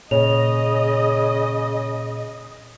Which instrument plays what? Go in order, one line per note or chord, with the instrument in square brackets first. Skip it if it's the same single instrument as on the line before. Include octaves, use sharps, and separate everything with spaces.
[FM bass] A#2 [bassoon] C#3 [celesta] C#5 F7 [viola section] D#5